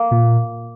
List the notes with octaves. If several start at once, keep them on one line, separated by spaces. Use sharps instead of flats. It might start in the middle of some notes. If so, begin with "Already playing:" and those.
Already playing: A#3
A#2